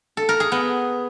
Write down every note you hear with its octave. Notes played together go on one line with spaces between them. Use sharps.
A4
A#4
G#4
B3